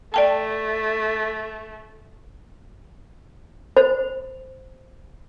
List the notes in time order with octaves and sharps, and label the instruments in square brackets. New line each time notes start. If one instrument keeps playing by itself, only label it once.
[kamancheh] A3 [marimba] D5 G5 A5
[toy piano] C5